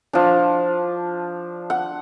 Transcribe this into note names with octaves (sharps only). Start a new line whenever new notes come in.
F3 D4
F#5